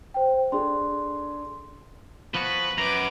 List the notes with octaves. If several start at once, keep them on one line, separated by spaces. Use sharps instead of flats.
C5 G5
D4 G#4 A4 C6
F3 B3 F#4 B4
F#2 B4 A#5 D6